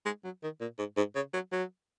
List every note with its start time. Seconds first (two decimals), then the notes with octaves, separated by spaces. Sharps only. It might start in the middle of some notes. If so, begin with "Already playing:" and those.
0.05 G#3
0.24 F#3
0.43 D#3
0.61 A#2
0.78 G#2
0.97 G#2
1.15 C#3
1.33 F#3
1.52 F#3